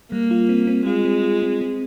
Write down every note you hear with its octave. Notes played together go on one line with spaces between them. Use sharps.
G3 A#3
F4
C4
C4
G#3 F4
C4
F4
C4
C4